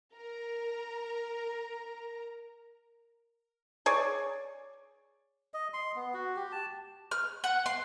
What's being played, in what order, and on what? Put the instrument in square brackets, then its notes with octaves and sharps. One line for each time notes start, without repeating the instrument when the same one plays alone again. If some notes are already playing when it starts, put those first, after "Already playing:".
[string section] A#4 A#5
[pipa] G#4 C#5 D5
[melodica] D#5
C6
B3
F#4
G4
A5
[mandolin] F6
F#5
C6